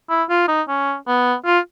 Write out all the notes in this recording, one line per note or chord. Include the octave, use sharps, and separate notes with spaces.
E4
F4
D#4
C#4
B3
F4